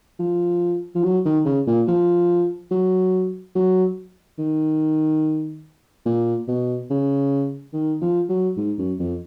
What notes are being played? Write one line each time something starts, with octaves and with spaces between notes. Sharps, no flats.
F3
F3
F#3
D#3
C#3
A#2
F3
F#3
F#3
D#3
A#2
B2
C#3
D#3
F3
F#3
G#2
F#2
F2